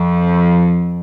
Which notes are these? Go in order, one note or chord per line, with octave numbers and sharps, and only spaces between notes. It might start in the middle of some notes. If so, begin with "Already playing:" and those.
Already playing: F2